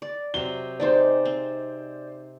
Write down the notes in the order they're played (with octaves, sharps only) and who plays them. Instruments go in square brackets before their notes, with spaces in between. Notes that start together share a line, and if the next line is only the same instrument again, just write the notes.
[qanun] D5
[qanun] C3 F#3 [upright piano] G7
[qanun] G#3 D#4 G4 [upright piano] C5 D5
[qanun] C4